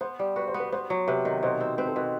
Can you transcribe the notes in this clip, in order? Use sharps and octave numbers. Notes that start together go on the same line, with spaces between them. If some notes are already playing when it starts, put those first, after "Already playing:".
B3 C5
G3
F#4 B4
C5
B3
B4
B3 C5
F#3
C3 B4
D#3
B2 C5
C4
C4 B4
A4
B2 B4